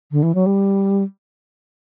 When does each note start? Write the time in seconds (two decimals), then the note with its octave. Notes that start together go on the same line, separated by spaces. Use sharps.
0.12 D3
0.23 E3
0.35 F#3
0.46 G3